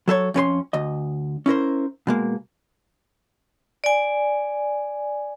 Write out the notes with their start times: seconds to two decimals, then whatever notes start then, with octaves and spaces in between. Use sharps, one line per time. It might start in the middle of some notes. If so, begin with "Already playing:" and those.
0.08 F#3 A4 B4 C#5
0.34 F2 C#4 B4 C6
0.73 D2 D#5
1.46 C#4 E4 A#4 C5
2.07 B2 G#3 A#3
3.84 D5 G#5